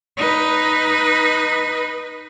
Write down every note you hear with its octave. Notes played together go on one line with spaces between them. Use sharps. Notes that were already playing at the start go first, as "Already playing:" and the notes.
D#4 B4